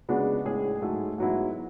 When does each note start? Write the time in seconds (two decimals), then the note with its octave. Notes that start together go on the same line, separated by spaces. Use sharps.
0.09 C#3 G#3 B3 D4 F#4
0.45 A2 G#3 C#4 G#4
0.82 G#2 F#3 A3
1.18 G#2 F#3 B3 E4